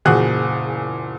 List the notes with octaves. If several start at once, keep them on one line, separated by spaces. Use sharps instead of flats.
F#1 E2 A#2 F#4 G#4 F#6